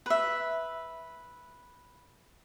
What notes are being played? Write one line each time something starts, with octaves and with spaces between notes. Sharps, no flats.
B4 E5